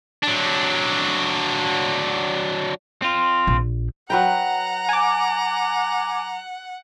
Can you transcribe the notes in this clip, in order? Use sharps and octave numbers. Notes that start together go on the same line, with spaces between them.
F#3 D4
C4 F4
A#1
F#3 B4 F#5 G5 A#5
G#5 D6